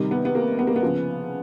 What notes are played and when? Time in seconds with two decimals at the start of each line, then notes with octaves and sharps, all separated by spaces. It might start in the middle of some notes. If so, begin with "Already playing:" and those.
Already playing: C3 D#3 G3
0.11 B3
0.25 B3
0.35 A#3
0.59 B3
0.67 A#3
0.76 B3
0.82 C#3 F3